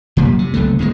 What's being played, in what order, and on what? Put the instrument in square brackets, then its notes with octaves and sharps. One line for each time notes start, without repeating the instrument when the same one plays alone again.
[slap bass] F#2 A#2 F3 G3
C3
F#1 C2 D3 A3
D#2 A2 C#3 G#3